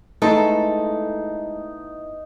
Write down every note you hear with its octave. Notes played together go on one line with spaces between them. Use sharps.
G#3 A3 B3 D#4 E4 A4